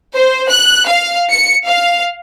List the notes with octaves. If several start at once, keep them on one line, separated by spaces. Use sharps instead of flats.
C5
F#6
F5
C#7
F5